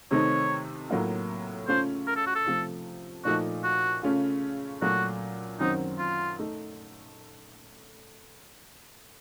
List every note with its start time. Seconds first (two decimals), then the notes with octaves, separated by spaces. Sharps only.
0.11 C3 D#3 A3 C4 D#4 C#5
0.90 A2 F#3 A#3 F4
1.68 C#3 A3 C#4 F4 C5
2.07 A#4
2.16 A4
2.27 F#4
2.35 A4
2.46 C3 F3 A3
3.24 A#2 F3 A3 D#4 F#4
3.64 F#4
4.03 C#3 A3 C#4 F4
4.82 A#2 F#3 A3 F#4
5.60 F#2 D#3 F#3 C4 D#4
5.99 F4
6.39 A3 D#4